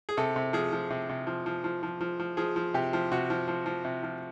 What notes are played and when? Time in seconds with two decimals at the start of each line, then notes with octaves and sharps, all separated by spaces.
0.09 G#4
0.17 C3 A4
0.36 C3
0.53 F3 G#4
0.72 F3
0.90 C3
1.09 C3
1.27 F3
1.46 F3
1.64 F3
1.83 F3
2.01 F3
2.20 F3
2.37 F3 G#4
2.56 F3
2.74 C3 G4
2.93 F3
3.12 C3 F#4
3.30 F3
3.48 F3
3.66 F3
3.85 C3
4.03 F3